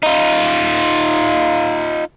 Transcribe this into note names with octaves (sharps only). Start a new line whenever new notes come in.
D#4 F4